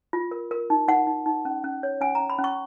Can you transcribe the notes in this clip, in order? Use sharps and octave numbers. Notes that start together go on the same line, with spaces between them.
F4
A#4
A#4
D#4
D#4 F#5
D#4
D#4
C#4
C#4
C#5
C#4 G#5
C#4 A#5
B5
C#4
C#6